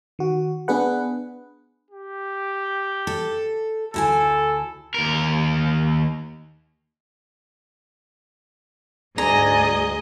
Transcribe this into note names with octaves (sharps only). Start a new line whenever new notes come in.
D#3 F#4
B3 D4 G#4 B4 F#5
G4
A4
D2 E4 A4 G#5
D#2 A#4
D2 G#2 G#4 D5 D#5 G#5 A#5